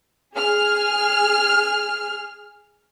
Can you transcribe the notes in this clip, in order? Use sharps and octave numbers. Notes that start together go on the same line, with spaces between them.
G#4 F6